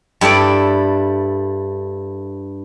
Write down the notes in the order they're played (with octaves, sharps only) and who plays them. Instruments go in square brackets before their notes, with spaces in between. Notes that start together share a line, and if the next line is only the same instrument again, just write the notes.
[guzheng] G2 E4 A4 D5